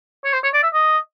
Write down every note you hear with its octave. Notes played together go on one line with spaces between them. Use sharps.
C#5
C5
C#5
D5
E5
D#5